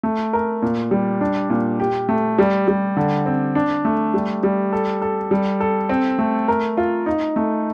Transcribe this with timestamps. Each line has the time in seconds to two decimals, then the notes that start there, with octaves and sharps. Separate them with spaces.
0.03 A3
0.33 A#4
0.62 A#2
0.91 G3
1.21 D4
1.50 A#2
1.80 G4
2.09 A3
2.39 G3
2.68 G3
2.97 D3
3.26 C4
3.55 D4
3.85 A3
4.14 G3
4.43 G3
4.73 A4
5.02 A4
5.31 G3
5.60 A4
5.89 C4
6.19 A3
6.48 A#4
6.77 F4
7.06 D#4
7.36 A3